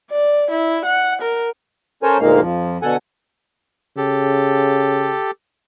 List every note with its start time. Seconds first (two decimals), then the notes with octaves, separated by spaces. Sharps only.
0.11 D5
0.51 E4
0.85 F#5
1.22 A#4
2.03 C#4 A4 A#4 C5 C#5 G#5
2.20 D2 A#2 D#3 G#3 A#3 F5
2.40 F2 F3
2.82 B2 D3 A4 F#5 G#5
3.97 C#3 G4 A4